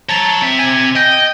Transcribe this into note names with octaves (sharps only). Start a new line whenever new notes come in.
C#5 A5 A#5
C4 E5
G#5
D#5 G5